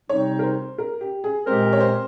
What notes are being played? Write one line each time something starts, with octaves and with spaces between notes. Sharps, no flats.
C3 G3 C4 D#4 C#5
A#4
C5
A#4
G4
G#4
A#2 G#3 C4 G4 A#4 C5
C#5
C5